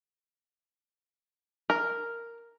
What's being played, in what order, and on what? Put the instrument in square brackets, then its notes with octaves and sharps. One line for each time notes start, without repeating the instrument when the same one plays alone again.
[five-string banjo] A#4